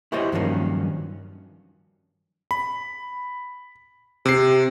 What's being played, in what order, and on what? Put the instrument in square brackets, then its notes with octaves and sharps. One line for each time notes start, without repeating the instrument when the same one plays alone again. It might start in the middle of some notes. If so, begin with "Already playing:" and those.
[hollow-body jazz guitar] E4 F#4 G4 C5 C#5 D#5
G2 D#3 F3 F#3 A#3 C#4
[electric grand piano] B5
[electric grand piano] C3 C7 [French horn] G4